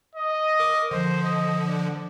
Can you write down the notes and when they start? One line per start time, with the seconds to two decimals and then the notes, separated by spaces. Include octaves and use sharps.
0.15 D#5
0.60 A#4 D6
0.91 D3 F3 C5
1.23 D#5
1.64 D4